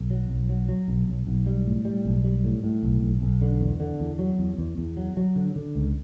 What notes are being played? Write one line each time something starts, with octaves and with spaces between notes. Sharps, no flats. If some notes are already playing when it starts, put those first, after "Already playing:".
Already playing: B1
F#3
B1
F#3
F#3
B1
B1
B1
G3
A2
G3
B1
G3
A2
A2
B1
B1
B1
D3
E2
D3
E2
F#3
E2
E2
E2
F#3
F#3
D3
D3
C#2